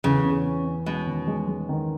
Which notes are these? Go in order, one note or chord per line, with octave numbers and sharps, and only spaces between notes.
E2 C#3
C#4
C#4
C#4
B2 G#3
D#3
G#3
G#3
D#3